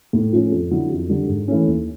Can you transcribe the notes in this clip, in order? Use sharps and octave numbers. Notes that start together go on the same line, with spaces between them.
A2
F3 A3 C#4
F2
D3 F#3 B3 E4
F2
D3 G3
G#2
E3 A3 C#4
D#2